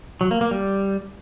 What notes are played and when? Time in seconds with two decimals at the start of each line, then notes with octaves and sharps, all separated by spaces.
0.21 F#3
0.31 A#3
0.41 A#3
0.51 G3